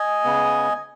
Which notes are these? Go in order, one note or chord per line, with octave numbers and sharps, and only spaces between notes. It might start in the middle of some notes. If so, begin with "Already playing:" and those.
Already playing: D#5 G#5
C#3 B3